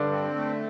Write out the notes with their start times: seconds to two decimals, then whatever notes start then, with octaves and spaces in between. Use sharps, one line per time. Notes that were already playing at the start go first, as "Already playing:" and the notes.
Already playing: G2 D3 D4
0.11 C4
0.36 A3